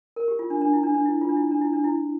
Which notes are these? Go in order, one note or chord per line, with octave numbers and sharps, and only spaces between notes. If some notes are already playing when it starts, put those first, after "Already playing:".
A#4
G4
F4
D4
D4
E4
D4
D4
E4
F4
D4
E4
D4
E4
D4
E4